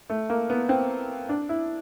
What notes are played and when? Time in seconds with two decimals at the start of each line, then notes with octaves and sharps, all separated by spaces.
0.10 A3
0.30 A#3
0.50 B3
0.69 C4
1.29 D4
1.49 E4